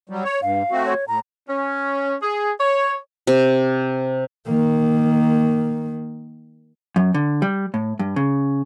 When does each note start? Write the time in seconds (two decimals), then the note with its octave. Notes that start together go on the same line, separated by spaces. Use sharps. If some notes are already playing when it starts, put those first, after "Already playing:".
0.10 F#3 G3
0.24 C#5
0.42 G2 F5
0.72 A3 C4 F#4
0.86 C#5
1.08 A2 A#5
1.49 C#4
2.22 G#4
2.60 C#5
3.27 C3
4.46 D#3 A#3
6.96 F#2
7.14 D3
7.42 G3
7.74 A2
7.99 G2
8.16 C#3